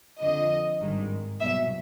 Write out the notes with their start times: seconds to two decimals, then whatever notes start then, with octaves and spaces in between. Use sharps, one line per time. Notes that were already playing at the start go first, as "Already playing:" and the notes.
0.19 F2 D3 F3 D#5
0.80 G#1 G2 D#3 G#3
1.40 C2 B2 F#3 E5